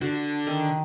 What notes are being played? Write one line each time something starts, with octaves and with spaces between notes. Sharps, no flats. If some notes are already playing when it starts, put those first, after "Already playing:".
D3 F#4
D#3